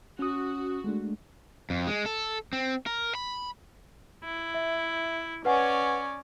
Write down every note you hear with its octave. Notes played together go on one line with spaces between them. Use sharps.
C#4 F#4 D#6
G#3 A3 D4
F2
G#3
A4
C4
A#4
B5
E4
E5
C#4 B4 C#5 D5 F#5 G#5